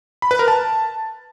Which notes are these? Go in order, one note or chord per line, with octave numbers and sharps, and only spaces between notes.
B5
B4
A#4
A5